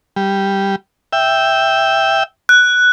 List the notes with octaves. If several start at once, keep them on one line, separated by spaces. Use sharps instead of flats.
G3
E5 G5
F#6